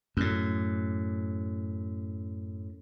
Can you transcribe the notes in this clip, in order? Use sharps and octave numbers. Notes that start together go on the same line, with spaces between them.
F#2 A2